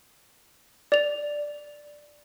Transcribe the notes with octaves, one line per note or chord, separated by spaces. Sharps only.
D5 F7